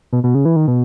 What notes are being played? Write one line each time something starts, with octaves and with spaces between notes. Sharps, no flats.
B2
B2
C#3
E3
D#3
B2